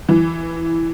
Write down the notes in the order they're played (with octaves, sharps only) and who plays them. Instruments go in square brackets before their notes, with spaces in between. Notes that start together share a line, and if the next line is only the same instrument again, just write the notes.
[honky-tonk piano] E3